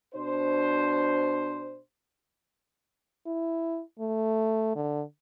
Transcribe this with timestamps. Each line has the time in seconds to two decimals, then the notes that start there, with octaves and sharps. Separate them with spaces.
0.13 B2 D4 C5
3.26 E4
3.99 A3
4.76 D3